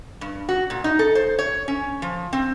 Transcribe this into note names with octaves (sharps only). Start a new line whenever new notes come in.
G2
F#4
A#2
D#4
A4
C5
C#5
C#4
F3
C4